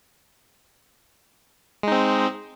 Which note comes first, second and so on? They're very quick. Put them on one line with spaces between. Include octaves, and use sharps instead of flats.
G#3 D#4 C4